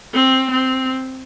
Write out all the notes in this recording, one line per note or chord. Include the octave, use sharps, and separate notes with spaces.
C4
C4